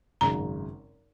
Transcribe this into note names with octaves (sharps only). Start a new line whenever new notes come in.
G#1 F#2 C#3 A#5